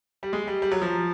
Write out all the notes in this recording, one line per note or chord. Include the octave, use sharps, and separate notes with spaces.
G3
G#3
G3
G3
F#3
F3